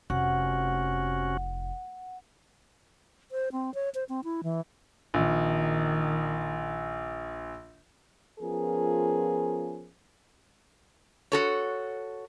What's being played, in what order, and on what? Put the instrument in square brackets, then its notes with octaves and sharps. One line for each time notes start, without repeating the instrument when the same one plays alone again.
[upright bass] F1 [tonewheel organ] C3 C#4 F#4 [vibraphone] F#5
[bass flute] C5
C4
C#5
C5
C4
E4
E3
[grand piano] A#1 [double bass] D#3
[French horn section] F3 B3 C#4 F4 G#4 A#4
[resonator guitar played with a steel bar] F#4 A4 C#5